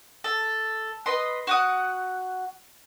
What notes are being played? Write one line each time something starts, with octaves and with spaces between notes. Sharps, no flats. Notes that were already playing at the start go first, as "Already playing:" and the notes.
A4
B4 D#5 C6
F#4 F#5 D#6